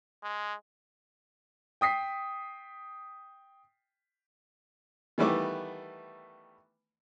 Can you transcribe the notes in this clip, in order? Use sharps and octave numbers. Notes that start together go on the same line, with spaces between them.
G#3
G5 D#6 B6 C7
D#3 E3 G3 A3 B3 D6